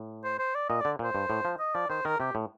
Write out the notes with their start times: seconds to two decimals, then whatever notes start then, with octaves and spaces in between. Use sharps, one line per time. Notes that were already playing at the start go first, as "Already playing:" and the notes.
Already playing: A2
0.24 C5
0.39 C5
0.55 D5
0.69 A#2 D#5
0.81 D3 D5
0.99 A#2 C5
1.15 G2
1.30 A2
1.45 F3
1.59 D#5
1.75 F3 D5
1.90 D#3 C5
2.05 D#3 A#4
2.20 C3 G4
2.35 A2